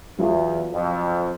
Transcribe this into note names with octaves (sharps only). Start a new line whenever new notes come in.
E2 F#3 E4 F4
F2